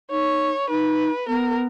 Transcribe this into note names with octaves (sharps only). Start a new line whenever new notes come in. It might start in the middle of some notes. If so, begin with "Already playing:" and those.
D#4 C#5
D#4 B4
B3 A#4